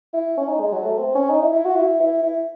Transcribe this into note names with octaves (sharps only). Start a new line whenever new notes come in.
E4
C#4
D#4
G#3
F#3
A3
C4
C#4
D#4
E4
E4
F#4
E4
E4
E4